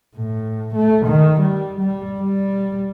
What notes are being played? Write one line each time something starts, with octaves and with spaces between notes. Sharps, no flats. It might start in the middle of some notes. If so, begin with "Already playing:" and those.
A2
A3
D#3
G3
G3
G3